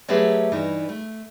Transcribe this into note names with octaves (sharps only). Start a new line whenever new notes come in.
F#3 A3 G4 G#4 B4 E5
G2 E3 D#4
A3